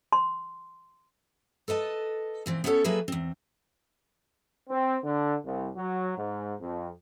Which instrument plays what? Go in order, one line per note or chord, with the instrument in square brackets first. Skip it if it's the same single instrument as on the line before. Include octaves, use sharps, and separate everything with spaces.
[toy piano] C6
[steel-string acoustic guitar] A4 B4 D#5 A5
A#2 E3 C4
B3 C#4 E4 F#4 A4 C#5
F#3 A#3 G#4 A4 B4 E5
E2 C4
[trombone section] C4
D3
C2
F#3
G#2
F2